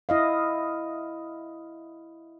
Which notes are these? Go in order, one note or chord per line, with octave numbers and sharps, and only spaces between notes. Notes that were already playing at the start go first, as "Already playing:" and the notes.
E4 D#5 F5